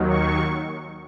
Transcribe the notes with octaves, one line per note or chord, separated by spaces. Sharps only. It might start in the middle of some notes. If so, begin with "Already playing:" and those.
Already playing: D#2 D#3 F#3
C#6